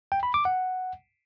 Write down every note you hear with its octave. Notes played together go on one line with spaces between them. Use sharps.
G5
B5
D6
F#5